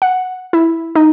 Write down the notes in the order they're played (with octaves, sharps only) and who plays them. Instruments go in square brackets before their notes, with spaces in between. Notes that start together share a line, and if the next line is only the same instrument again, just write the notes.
[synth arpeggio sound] F#5
E4
D#4